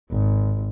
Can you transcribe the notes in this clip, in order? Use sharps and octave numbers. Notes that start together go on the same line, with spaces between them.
G#1